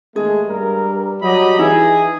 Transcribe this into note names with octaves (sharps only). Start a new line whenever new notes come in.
D#2 G#3 A3 G#4
G2 G3 A#4
F#3 G4 D#5 B5
E3 D#4 E4 G#4 D#5